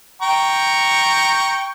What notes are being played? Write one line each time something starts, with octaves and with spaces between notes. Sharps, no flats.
G5 A#5 C#6